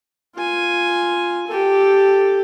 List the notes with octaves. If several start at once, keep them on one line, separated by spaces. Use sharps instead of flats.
F4 G#5
G4 A4